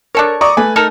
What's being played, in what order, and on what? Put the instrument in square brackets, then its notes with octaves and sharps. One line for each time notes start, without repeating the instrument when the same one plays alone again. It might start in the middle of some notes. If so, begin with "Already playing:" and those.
[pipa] D4 A4 C#5 [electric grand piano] A#4
[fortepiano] D5 [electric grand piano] A#5 C#6 D#6
[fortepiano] A3 [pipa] B4 [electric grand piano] G#5
[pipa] D#4 A4 A#4